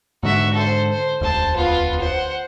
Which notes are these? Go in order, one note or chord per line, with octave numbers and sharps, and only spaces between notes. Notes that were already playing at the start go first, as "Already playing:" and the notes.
G#2 D3 F#4 E5
A4 C5
C5
E1 D2 C5 A5
B3 F4
C5 F#5